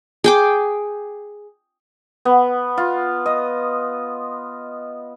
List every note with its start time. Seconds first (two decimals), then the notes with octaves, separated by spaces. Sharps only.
0.24 G#4 G5 D6
2.25 B3
2.78 F4
3.26 D#5